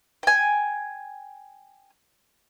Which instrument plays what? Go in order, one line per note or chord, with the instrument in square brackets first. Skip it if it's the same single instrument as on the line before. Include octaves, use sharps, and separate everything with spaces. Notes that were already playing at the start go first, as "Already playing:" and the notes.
[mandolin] G5 G#5